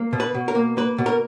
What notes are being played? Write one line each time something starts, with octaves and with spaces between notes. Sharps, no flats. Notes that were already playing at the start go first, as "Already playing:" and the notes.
Already playing: A#3
B2
B4
B2
A#4
A#3
A#3 B4
B2
A#4